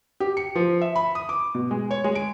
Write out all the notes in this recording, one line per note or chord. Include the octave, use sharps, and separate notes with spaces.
G4
C#7
F3
E5
B5
D#6
D6
B2
G#3
C#5
G#3
D7